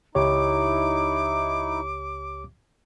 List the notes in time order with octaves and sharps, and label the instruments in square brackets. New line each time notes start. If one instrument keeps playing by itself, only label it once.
[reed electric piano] C#2 G4 C#5 [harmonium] D#4 E4 [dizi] D6